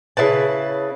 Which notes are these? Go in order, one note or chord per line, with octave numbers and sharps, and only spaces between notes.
C#3 E4 B4 A5